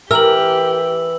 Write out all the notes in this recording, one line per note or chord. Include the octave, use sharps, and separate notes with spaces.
E3 G4 A#4 E6 F#7